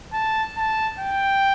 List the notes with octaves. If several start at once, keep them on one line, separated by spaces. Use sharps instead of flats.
A5
A5
G5